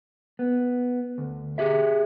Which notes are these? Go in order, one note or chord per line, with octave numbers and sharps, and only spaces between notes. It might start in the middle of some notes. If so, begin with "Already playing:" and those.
B3
D2
G4 G#4 E5